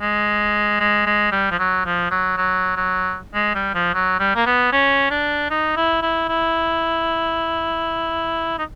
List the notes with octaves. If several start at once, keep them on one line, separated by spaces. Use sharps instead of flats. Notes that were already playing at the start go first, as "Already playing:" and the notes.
G#3
G#3
G#3
G3
F3
F#3
F3
F#3
F#3
F#3
G#3
G3
F3
F#3
G3
A#3
B3
C#4
D4
D#4
E4
E4
E4
D#4